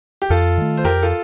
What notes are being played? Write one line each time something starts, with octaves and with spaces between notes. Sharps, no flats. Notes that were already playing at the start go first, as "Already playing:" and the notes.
G4
F2 F4 A4
D#3 A3
C5
F2 G4 A#4
F4 A4